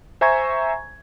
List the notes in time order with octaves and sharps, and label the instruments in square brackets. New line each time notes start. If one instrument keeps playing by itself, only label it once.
[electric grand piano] C5 E5 G#5 A#5 C#6 G#6